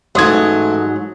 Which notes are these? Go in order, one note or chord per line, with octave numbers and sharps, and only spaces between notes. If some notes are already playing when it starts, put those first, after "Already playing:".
A1 G#2 F#3 A3 C6 D#6 G#6